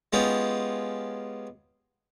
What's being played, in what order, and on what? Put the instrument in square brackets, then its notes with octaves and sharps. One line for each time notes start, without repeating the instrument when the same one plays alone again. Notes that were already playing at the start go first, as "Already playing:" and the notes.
[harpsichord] G#3 B3 C#4 F4 G4